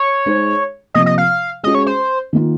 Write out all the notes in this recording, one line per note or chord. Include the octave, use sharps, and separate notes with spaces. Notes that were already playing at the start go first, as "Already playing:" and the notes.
Already playing: C#5
G#3 D#4 G#4 C5
C3 F3 A#3 D#5
D#5
F5
G#3 C#4 F#4 D#5
C#5
C5
D#3 A#3 F4